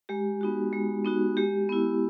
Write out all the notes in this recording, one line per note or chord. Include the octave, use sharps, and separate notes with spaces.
G#3 G4
B3 D#4 F#4
G#3
B3 D#4 F#4
G#3 G4
B3 E4